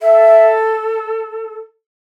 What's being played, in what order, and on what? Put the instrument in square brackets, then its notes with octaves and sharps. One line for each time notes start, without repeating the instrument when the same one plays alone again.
[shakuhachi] A4 [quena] E5